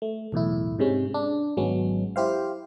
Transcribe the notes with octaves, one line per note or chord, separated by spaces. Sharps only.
A3
B1 E2 A2 E4
G#2 C3 G#3 C#4
D4
G#1 F#3 G#3 B3 C#4
E4 G4 C5 F5